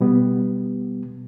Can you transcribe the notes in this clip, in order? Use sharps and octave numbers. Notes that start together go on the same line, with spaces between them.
B2 G3 B3